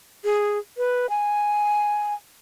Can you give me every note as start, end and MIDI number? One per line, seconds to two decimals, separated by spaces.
0.24 0.58 68
0.78 1.06 71
1.10 2.14 80